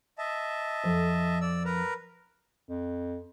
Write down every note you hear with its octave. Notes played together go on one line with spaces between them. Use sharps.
D#5 E5 A5
F2 F3 C5
D5 E6
A#4 B4 A#5
F2